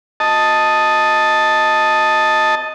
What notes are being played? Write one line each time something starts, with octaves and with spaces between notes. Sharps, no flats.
D#5 A5